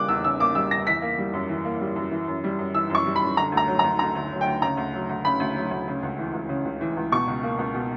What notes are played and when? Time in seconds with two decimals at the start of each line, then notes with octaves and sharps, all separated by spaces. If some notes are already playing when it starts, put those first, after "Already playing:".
Already playing: C#3 G3 A#3 D6 F#6
0.08 E2 E6
0.24 C#3 E6
0.40 A#3 D6
0.55 G3 E6
0.71 E2 A#6
0.87 E3 B6
1.02 A#3
1.18 G3
1.33 F#2
1.49 E3
1.65 A#3
1.81 G3
1.96 F#2
2.12 E3
2.28 F#2
2.44 G3
2.59 F#2
2.74 E3 E6
2.90 F#2 C#6
3.06 G3
3.16 B5
3.22 F#2
3.37 D3 A#5
3.52 D2
3.57 A#5
3.68 F#3
3.79 A#5
3.84 D2
3.99 D3 A#5
4.15 D2
4.31 F#3
4.41 G5
4.47 D2
4.62 C#3 A#5
4.77 D2
4.94 F#3
5.09 D2
5.24 C#3 B5
5.40 D2
5.56 F#3
5.71 D2
5.88 C#3
6.03 C#2
6.19 E3
6.33 C#2
6.49 C#3
6.65 C#2
6.81 E3
6.97 C#2
7.12 B2 C#6
7.28 C#2
7.43 A#3
7.59 C#2
7.75 B2